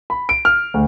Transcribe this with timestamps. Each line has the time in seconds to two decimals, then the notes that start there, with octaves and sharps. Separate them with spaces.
0.10 B5
0.29 D7
0.45 F6
0.74 D2